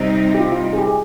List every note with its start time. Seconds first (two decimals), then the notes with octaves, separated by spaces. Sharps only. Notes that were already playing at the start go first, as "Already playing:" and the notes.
Already playing: C3 G3 C4 D#4
0.35 G4
0.40 F4
0.52 F4
0.65 F4
0.73 G#4
0.78 G4
0.87 G#4